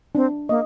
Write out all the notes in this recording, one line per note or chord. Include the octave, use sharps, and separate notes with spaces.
C4 D4
A#3 D#5